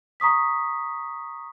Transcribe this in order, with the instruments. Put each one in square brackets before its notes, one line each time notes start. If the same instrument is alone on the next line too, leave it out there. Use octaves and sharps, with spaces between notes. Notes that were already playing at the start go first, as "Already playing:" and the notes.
[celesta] A#5 C#6 D#6 B6